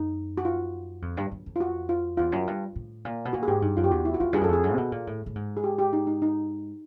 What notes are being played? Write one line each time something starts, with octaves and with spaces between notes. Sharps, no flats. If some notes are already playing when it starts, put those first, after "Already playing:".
Already playing: F#2 D#4
F#4
F4
F2
G2
F#2
F2
F4
F#4
F4
E2 F4
F#2
G2
A2
A#2
B2
A#2 F#4
G#4
G#2 G4
G2 D#4
F#2 F4
G4
E2 F#4
E4
F#4
E2 F4
G2 G#4
F#2
A4
F2 G#4
F#2
C3
B2
A#2
A2
A2
G#2
G#4
G4
G4
D#4
D#4
D#4